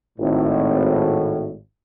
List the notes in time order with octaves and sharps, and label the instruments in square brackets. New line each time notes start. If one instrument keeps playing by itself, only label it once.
[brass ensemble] G#1 A2